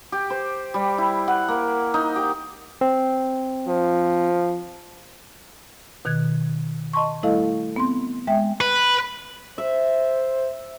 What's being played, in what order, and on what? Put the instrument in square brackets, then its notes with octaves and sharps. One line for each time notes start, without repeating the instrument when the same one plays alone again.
[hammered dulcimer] G4
C5
G3
E4
F#5
A#3
D#4
G4
[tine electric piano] C4
[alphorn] F3
[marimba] B2 D#3 F#6 G#6
D#5 A5 C6 C#6
G3 A3 E4 A4 D#5 F5
B3 C4 C6
G#3 E5 G5
[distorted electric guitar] B4
[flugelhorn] C5 [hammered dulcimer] E5